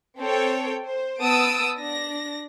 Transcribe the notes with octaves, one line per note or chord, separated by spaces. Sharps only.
C4 A4 C5 C#5 G5
C5
B3 A5 D#6 E6 D7
D4 A#6